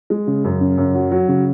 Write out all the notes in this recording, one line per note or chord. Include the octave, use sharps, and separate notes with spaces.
G#3
C#3
F#2
C#3
F#2
F#3
F#3
C#3